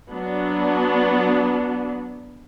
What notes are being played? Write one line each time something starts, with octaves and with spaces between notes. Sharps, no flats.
F#3 B3 D4